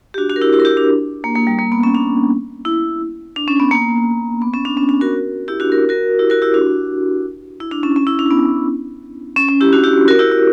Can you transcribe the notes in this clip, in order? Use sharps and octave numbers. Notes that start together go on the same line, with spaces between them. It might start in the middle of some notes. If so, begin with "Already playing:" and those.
G4
D4 F#4
D4 F#4
A#4
E4 G4
E4 G4
A#4
E4 G4
D4
A#3
A#3
G3
A#3
B3
C#4
D4
E4
D4
C#4
B3
A#3
B3
C#4
D4
C#4
D4
F#4 A#4
E4 G4
D4 F#4
A#4
F#4 A#4
E4 G4
F#4 A#4
E4 G4
D4 F#4
E4
D4
C#4
C#4
E4
D4
B3
C#4
C#4
E4 G4
D4 F#4
E4 G4
F#4 A#4
E4 G4
E4